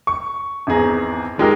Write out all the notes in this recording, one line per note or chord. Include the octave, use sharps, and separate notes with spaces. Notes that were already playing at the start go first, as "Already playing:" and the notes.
C#6
G#1 E2 G#4 A#5
D#3 G#3 G4 A#4